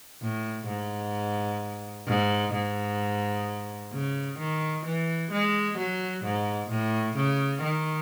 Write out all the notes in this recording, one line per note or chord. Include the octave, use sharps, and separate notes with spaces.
A2
G#2
G#2
G#2
C#3
D#3
E3
G#3
F#3
G#2
A2
C#3
D#3